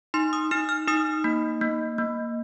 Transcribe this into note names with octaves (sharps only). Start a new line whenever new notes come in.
D#4 C6
D#6
D#4 F6
F6
D#4 D#6
A#3
A#3
A#3